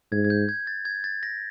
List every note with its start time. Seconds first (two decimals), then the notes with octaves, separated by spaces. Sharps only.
0.12 G#2 G#6
0.25 G#6
0.30 G6
0.49 G#6
0.67 A6
0.85 G#6
1.04 A6
1.23 A#6